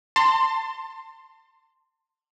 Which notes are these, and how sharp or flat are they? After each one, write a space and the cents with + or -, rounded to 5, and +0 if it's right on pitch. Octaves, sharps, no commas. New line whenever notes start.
A5 +35 C6 +0